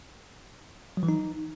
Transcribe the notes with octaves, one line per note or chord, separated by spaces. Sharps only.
F#3
E3
D#4